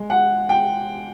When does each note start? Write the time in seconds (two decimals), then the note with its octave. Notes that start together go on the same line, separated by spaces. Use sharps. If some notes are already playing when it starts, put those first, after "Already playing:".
Already playing: G#3
0.10 F#5
0.49 G5